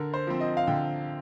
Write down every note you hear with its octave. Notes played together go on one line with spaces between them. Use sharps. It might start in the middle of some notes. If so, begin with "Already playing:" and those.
Already playing: D3 A#4
C5
F3 C4
D#5
F5
D3 G5